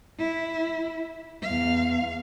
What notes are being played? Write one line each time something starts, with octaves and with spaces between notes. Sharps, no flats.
E4
E2 F5